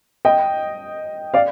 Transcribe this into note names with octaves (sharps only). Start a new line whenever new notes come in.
D#5 G5
D5 F5